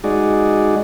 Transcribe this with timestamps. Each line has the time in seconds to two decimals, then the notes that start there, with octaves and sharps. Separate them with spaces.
0.04 G#3 D#4 F#4 G#4 D5